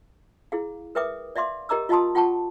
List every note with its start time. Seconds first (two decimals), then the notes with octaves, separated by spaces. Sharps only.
0.52 E4 G#4 F5
0.95 A#4 B4 E5 G5 D6 D#6
1.36 D5 E5 F5 C6 D6
1.69 G4 A#4 D#5 A#5 D6 E6
1.89 F4 D#5 F5 A5 C6 D#6
2.15 F4 F#5 G5 A5 C#6